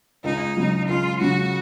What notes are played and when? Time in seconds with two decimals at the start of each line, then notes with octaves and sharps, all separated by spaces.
0.24 C#2 D#4
0.56 C#3 F#3
0.89 C#2 F4
1.21 C#3 F#3 F#4